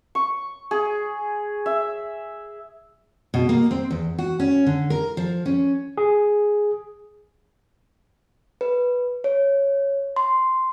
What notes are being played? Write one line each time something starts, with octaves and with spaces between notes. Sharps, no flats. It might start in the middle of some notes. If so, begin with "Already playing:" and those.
C#6
G#4
E5
B2
A#3
C4
E2
F#4
C#4
D3
A#4
F3
C#4
G#4
B4
C#5
C6